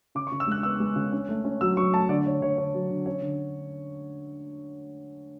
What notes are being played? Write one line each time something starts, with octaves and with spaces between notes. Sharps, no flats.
C#3 D6
C#6
C#3
E6
G#3 F#6
B3 E6
G#3
C#3
C#4
A3
C#4
F#3 E6
F#3 C#6
A3 A5
D3 D5
D3 C#5
D3 C#5
D3 C#5
F#3
D3
C#4 C#5
D3